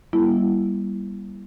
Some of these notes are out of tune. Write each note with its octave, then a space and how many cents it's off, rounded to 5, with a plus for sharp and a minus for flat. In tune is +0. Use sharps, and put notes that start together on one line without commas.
G3 +5 A#3 +45 E4 +15